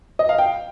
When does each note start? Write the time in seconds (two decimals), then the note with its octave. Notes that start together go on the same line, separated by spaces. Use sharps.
0.19 D#5
0.29 F5
0.38 G5